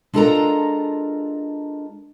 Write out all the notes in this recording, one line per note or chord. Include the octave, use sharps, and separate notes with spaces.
G#3 D4 F4 A4 A#4 A#5